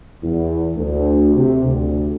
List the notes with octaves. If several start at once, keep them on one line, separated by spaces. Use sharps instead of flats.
E2
D2
C3
D2